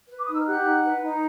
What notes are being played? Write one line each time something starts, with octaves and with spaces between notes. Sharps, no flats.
B4
D6
D#6
D#4 E6
F6
G4 F#5 F#6
D#4
B4
D#4